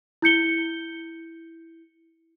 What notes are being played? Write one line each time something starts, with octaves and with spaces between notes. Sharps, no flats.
E4 G6 C#7 G7